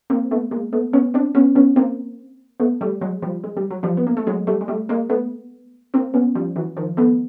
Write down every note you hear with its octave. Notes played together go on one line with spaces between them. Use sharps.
A#3 C4
A3 B3
G#3 A#3
A3 B3
B3 C#4
C4 D4
B3 C#4
B3 C#4
A#3 C4
A3 B3
G3 A3
F#3 G#3
F3 G3
G#3
G3
F#3
F3 G3
B3
A#3
A3
F#3 G#3
G3 A3
G#3
G3 A3
G#3 A#3
A3 B3
A#3 C4
B3 C#4
F3 G3
E3 F#3
D#3 F3
A3 B3